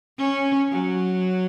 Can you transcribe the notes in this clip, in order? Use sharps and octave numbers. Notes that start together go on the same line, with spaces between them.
C#4
F#3